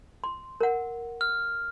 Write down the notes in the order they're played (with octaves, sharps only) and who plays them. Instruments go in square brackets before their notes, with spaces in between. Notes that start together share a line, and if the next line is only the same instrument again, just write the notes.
[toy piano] C6
A#4 F#5
[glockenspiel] F6